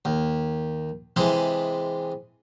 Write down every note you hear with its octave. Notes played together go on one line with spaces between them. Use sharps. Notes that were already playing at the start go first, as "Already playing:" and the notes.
D#2
C3 E3 G#3